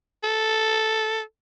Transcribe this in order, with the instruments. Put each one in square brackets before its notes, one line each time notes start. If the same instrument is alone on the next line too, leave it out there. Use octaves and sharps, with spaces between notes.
[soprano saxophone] A4